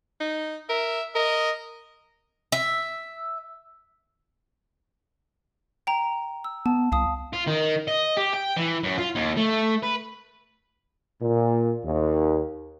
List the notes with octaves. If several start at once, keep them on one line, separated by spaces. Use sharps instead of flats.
D#4
A#4 E5
A#4 D#5
E5
G5 A#5
E6
B3 A5
C2 F5 A5 D#6
F4
D#3
D#5
G4
G5
E3
F#2
F4
D#2
A3
B4
A#2
D#2